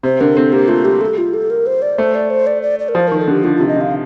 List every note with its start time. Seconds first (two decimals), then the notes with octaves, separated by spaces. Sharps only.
0.03 C3 C5
0.20 D3 A#4
0.36 C4 A4
0.52 A#3 G4
0.68 A3 F4
0.85 G3 G4
1.01 A4
1.18 F4
1.34 A4
1.50 A#4
1.66 C5
1.82 D5
1.98 A3 C5
2.15 D5
2.30 C5
2.47 D5
2.62 D5
2.79 D5
2.89 A#4
2.95 F3 C5
3.08 D#3 A#4
3.19 A4
3.28 D3 G4
3.44 D3 F4
3.56 C3 F4
3.68 D#5
3.76 D3 F5